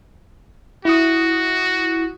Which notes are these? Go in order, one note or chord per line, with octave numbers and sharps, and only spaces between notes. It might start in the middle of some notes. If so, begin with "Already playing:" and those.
E4 F#4 D#6